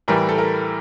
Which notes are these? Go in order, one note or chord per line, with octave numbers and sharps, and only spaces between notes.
A2 E3 G3 A#4
A4
A#4